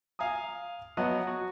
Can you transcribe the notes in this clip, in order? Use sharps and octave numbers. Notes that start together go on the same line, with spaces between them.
F5 G#5 A#5 D#6
F#3 B3 D#5 F#5 A5
F#4